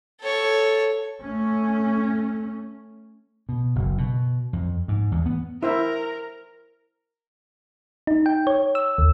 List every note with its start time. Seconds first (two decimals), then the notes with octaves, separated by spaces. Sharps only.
0.22 A4 C#5
1.22 A3 C#4
3.49 B2
3.75 F#1
3.98 B2
4.53 F2
4.88 G#2
5.12 E2
5.26 B3
5.63 E4 A#4 C5 E5
8.07 D#4
8.26 G5
8.47 C#5
8.75 E6
8.98 D#2